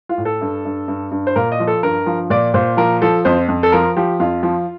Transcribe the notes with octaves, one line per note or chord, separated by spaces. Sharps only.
F4
A2
A4
G2
G2
G2
G2
C5
A#2 A#4
D#5
F3
A4
G2 A#4
F3
A#2 D5
A#2 C5
F3 A#4
F3 A4
F2 C5
F2
A4
F3 A#4
F3 G4
F2 F4
F3